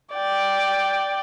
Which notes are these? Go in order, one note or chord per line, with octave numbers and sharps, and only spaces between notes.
D5 G5